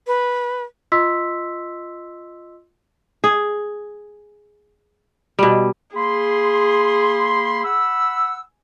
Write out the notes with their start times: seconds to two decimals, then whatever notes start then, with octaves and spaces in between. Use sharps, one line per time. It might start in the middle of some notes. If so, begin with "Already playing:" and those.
0.07 B4
0.92 F4 D#5 C6 E6 B6
3.24 G#4
5.39 B2 G3
5.96 A#3 G#4 B5 C6
7.64 F#5 B5 E6